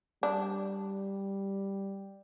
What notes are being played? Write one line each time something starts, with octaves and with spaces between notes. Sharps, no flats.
G3 D4